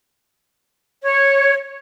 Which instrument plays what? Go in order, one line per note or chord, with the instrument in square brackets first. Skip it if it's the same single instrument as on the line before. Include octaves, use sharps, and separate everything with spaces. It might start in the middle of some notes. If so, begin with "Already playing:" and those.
[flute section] C#5